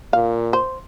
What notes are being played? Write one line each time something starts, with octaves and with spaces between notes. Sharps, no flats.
A#2 F5
C5